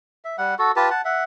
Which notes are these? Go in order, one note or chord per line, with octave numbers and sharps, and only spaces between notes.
E5
G3 F#5
F#4 A4
F4 G4 B4 A5
F#5 A5
E5 F#5